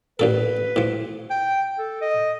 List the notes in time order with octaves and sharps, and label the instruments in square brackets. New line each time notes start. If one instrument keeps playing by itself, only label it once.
[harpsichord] A1 A#2 A4 [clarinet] B4
[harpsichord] A2 F3
[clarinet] G5
A4
D#5